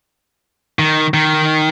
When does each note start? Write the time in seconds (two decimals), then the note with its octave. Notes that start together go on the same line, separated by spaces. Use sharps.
0.79 D#3
1.14 D#3